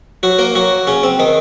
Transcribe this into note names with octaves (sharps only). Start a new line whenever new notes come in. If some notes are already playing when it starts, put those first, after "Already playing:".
F#3 F#4
A#3 A#4
F#3 F#4
C#3 C#4
C4
D#3 D#4